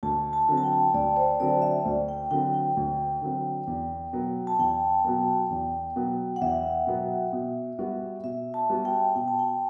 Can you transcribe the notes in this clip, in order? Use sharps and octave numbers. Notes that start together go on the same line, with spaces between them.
D2 A5
A5
D3 F#3 C4
A5
G5
D2 D5
C5
D3 F#3 C4 D5
E5
D2
G5
D3 F#3 C4 G5
G5
D2
D3 F#3 C4
E2
B2 F#3 B3
A5
E2 G5
B2 F#3 B3
E2
B2 F#3 B3
F#5
E2 E5
B2 F#3 B3
B2
G3 B3 F#4
B2 E5
A5
G3 B3 F#4
G5
B2 G5
A5
G5